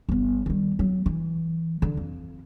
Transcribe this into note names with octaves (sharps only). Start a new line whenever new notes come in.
G1 B3
D#3 G3
F#3
E3
D3
F2